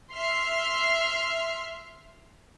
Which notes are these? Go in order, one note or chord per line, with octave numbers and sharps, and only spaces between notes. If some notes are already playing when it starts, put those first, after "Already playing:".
E5 C6 F6 C7